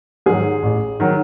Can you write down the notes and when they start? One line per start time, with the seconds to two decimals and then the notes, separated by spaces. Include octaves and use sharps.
0.26 G#2 D#3 F#3 G#4
0.63 A1
1.00 D#3 F#3